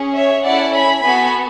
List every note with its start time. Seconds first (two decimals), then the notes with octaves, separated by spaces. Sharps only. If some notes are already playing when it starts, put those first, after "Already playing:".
Already playing: C#4 G#4
0.14 C#5 E5
0.44 C#4 E4 A4 D5 F#5
0.73 G#5 B5
1.02 B3 F#4 A4 G#5 B5